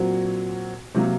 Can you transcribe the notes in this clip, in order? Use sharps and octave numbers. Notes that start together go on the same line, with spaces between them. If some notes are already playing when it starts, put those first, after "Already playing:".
Already playing: A#2 F#3 C4 F#4
C3 F#3 A#3